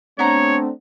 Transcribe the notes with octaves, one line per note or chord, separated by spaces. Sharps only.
A3 B3 C4 D4 C#5 A#5